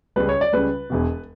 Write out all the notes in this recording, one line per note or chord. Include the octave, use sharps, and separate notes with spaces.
C#2 C#3 G3 B4
C#5
D5
C#2 C#3 G3 B4
E1 E2 B2